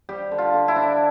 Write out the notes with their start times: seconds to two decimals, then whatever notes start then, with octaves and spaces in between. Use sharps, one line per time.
0.09 G3 G4
0.31 D3
0.38 F4
0.54 D3
0.68 E4
0.76 D4